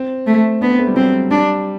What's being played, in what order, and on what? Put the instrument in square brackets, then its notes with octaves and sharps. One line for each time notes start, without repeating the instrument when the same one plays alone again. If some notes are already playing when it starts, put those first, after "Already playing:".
Already playing: [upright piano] C4
[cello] A3
[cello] B3 [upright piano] D4
[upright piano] C4
A3
G3
[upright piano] F#3 [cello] C4
[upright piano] G3
[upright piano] G3 [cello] D4